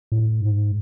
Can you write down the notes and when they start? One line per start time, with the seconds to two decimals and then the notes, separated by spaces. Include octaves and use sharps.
0.12 A2
0.41 G#2